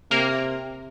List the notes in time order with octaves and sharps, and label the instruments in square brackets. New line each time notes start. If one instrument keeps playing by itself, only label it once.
[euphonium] C3 [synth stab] A#3 A#4